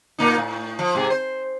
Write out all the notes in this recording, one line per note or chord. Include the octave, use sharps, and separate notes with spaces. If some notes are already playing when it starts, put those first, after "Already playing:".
A#2 A#3 D#4
A2
F3
G#2 C3 G#4
C5